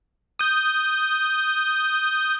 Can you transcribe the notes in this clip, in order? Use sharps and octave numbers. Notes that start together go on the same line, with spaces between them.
D#6 G6